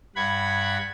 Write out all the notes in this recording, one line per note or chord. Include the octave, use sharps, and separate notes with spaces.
G2 F#5 B5 G#6